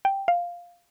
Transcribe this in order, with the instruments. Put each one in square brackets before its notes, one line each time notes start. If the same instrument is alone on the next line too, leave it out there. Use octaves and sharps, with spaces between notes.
[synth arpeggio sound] G5
F5